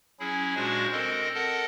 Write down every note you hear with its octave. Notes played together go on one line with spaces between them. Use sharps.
F#3 C#4 E4 G#4
A#2 G#3 D4 F#4 C5 C#6
C4 A4 A#4 D#5
A4 A#4 D#5 F#5 A5